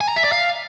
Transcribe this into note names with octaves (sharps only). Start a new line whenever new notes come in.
G#5
A#5
E5
D5
F5